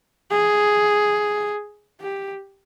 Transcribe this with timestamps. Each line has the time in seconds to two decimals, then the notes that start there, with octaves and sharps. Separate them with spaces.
0.30 G#4
2.01 G4